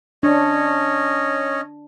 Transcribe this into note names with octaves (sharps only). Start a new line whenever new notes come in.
C#4 D4 C#5 D#5